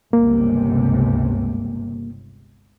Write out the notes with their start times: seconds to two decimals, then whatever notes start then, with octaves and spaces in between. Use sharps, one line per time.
0.13 G1 C#2 C3 A#3